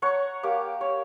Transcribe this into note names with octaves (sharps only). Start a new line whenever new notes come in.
C#5 F#5 A#5 C#6
A#3 G4 D6
C#5